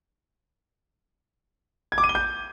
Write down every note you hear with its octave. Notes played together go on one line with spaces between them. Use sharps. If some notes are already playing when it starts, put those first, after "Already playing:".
G#6
D6
D#7
G7
G6